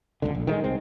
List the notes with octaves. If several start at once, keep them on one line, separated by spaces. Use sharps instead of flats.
D#1 G#1 C#2 D3
A#1
D#3 E3 G#3
C2 G#3 C4